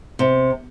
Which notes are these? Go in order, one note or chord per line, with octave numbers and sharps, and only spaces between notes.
C3